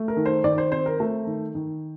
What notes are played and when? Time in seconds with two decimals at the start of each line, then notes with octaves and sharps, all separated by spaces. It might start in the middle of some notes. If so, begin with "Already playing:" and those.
Already playing: A3
0.08 A#4
0.17 D#3
0.26 C5
0.44 D#3 D5
0.58 C5
0.72 C4 C5
0.86 A#4
1.00 A3
1.27 D#3
1.55 D#3